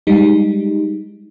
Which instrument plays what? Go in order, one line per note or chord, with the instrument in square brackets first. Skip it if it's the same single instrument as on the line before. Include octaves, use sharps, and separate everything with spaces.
[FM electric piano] G3 G#3 D#4